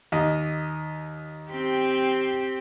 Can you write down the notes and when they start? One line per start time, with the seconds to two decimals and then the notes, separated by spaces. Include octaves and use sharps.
0.12 D#2 D#5
1.50 C4 G4